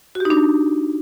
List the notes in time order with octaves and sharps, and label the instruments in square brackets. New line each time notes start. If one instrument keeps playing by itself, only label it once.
[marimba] F#4
G4
D#4
D4